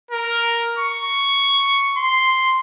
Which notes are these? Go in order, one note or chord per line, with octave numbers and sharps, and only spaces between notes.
A#4
C#6
C6